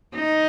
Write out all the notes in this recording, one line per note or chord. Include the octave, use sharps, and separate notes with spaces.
D#4